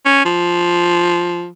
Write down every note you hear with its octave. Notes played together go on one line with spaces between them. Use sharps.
C#4
F3